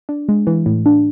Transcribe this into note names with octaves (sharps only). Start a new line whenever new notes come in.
D4
G#3
E3
A2
D4